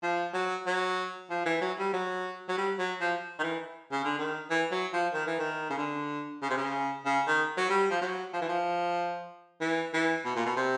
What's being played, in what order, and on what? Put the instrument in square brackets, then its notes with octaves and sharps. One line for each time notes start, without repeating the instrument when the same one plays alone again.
[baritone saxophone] F3
F#3
F#3
F3
E3
F#3
G3
F#3
F#3
G3
F#3
F3
D#3
E3
C#3
D3
D#3
E3
F#3
F3
D#3
E3
D#3
C#3
D3
C#3
C3
C#3
C#3
D#3
F#3
G3
F3
F#3
F3
E3
F3
E3
E3
B2
A#2
B2
C3